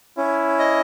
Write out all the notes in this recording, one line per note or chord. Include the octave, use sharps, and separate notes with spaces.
C#4 E4
D#5